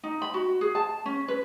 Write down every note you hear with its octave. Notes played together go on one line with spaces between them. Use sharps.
D#4
B5
F#4
G#4
A5
C#4
B4